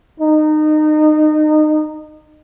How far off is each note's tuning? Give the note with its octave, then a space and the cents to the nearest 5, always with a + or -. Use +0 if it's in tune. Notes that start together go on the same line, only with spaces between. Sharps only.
D#4 -25